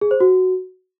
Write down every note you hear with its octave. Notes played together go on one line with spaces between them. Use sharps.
G#4
C5
F#4